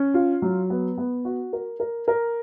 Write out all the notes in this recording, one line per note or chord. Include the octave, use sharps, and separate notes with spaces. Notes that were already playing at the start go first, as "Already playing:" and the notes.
Already playing: C#4
F4
F#3
B3
B3
F#4
A#4
A#4
A#4